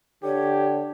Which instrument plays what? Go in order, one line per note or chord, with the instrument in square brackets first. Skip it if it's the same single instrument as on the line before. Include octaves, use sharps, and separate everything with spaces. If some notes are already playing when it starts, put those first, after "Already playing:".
[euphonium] D3 [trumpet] G4 [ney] C#5